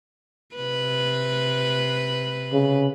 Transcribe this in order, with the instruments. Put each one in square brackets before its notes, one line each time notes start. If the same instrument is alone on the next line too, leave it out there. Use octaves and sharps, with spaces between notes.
[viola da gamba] C3 B4
[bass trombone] C#3